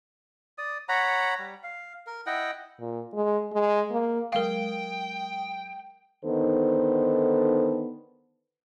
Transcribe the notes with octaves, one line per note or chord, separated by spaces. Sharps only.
D5 D#6
C#5 F#5 A#5 B5
G3
F5
A#4
E4 D#5 F#5 G5
A#2
G#3
G#3
A#3
F#3 G#3 A#4 F5 G5 D#6
D3 D#3 B3 D#4 A4 C5